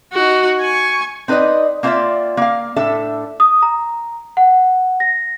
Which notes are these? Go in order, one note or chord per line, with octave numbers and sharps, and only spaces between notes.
D#4 F#4
G#5 C#6
C4 D#4 B4 C5 D5 D#5
A#3 C4 F4 C#5 D5 E5
A#3 F5
A2 D4 A4 E5
D#6
A#5
F#5
A#6